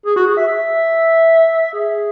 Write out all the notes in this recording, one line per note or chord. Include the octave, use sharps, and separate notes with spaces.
G#4
F#4
G#4
E5
E5
G#4